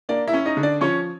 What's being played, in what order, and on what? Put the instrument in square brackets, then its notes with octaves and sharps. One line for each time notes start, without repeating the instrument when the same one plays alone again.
[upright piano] A#3 D4 D5
E4 E5
C#4
D#4 D#5
D3
D4 D5
F3 C#4 C#5